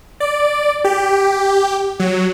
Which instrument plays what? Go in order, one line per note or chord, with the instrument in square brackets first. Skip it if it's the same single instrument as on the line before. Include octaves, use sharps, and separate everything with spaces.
[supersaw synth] D5
G4
F#3